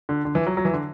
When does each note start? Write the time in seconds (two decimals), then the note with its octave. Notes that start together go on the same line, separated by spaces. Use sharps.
0.09 D3
0.25 D3
0.35 E3
0.46 F#3
0.57 F#3
0.65 E3
0.73 D3